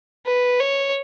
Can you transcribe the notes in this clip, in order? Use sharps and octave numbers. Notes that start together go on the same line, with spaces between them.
B4
C#5